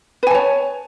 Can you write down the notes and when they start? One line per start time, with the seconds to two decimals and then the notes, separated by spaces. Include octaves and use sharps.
0.23 B4
0.27 G#5
0.31 A5
0.35 C#5